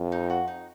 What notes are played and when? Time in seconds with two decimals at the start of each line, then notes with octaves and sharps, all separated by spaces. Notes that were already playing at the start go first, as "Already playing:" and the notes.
Already playing: F2
0.12 D#4
0.30 F#4
0.48 D#4